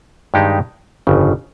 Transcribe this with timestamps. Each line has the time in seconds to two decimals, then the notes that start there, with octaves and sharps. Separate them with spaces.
0.34 G2 D#3 G#3 D#4 G4
1.07 G1 F2 C#3